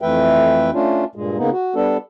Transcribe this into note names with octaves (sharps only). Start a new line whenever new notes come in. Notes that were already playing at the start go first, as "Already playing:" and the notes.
F2 E3 A3 B4 E5 G5
A3 C#4 D4 F4
G2 A#2 G#3
C#3 A#3 B3 D#4
F#4
G3 B3 D4 A4